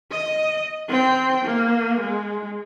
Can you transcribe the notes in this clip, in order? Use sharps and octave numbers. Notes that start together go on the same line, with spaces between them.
D#5
C4 G5
A#3
G#3